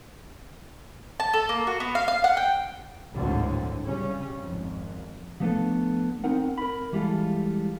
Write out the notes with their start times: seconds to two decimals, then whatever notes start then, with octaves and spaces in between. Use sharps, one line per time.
1.20 A5
1.33 A4
1.49 A#3
1.67 F#4
1.80 B3
1.95 F5
2.08 F5
2.24 F#5
2.37 G5
3.14 G#1 D2 A2 D3 F#3 C4
3.85 C#3 G3 C#4
4.42 G#1 F2
5.40 F3 G3 A3 B3 D4 A4
6.24 C4 D#4 A#4 F#5
6.58 A#4 B5
6.93 E3 G3 G#3 F4 A4